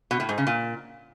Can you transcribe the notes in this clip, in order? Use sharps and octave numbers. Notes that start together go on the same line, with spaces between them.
B2
A2
G#2
C#3
A#2